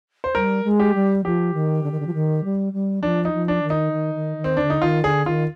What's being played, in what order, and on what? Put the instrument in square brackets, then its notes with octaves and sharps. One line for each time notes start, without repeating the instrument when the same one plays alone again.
[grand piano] C5
[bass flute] G3 [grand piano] A#4
[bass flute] G#3
[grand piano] G4
[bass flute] G3
[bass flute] F3 [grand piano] G4
[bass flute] D#3
D3
D#3
D3
F3
D#3
G3
G3
[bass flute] F3 [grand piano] D4
[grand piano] D#4
[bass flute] F3
[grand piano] D4
[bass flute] D#3
[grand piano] D#4
[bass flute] D#3
D#3
D#3
[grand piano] C4
[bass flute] D3 [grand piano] D4
[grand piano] D#4
[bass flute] D#3 [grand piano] F4
[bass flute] D3 [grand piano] G#4
[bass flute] D#3 [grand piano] F4